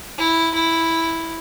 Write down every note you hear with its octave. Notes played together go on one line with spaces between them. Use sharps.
E4
E4